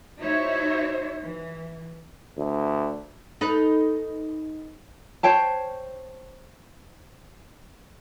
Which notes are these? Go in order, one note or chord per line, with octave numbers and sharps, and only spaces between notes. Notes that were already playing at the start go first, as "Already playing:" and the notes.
D#4 E4 F#4 C5 C#5 E5
E3
D2
D#4 A4 B4
C5 C#5 G5 A5